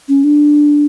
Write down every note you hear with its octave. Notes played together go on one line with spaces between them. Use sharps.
C#4
D4